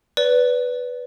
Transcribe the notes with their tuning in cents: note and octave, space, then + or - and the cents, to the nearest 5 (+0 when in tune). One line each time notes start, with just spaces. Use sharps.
B4 +0 D5 -25